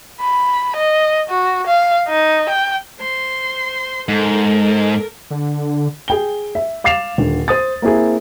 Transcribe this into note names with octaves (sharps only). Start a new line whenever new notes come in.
B5
D#5
F#4
F5
D#4
G5
C5 C6
G#2 A4 A#4
D3
G#4 G5 G7
E5
F5 D6 A6 C7 E7 F7
D#1 D3
C5 D#6 A6
A#3 C4 E4 G#4